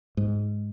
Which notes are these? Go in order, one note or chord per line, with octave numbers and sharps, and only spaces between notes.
G#2